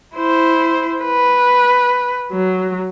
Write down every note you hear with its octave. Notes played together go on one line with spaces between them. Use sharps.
E4 C5
B4
F#3